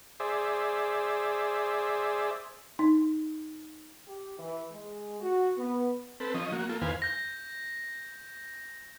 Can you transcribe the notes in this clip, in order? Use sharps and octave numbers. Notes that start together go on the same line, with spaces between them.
G#4 C5 D5 E5
D#4
G4
E3
G#3
F#4
B3
C4 A4 B4
F3 C#4 D#5
A#3 F#4
A#3 F4 A4
E2 D#3 B4 C5 F5 G#5
G6 A#6